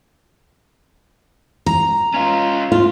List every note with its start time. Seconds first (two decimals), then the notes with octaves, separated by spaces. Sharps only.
1.66 A#5
2.14 C#4 F4
2.72 F4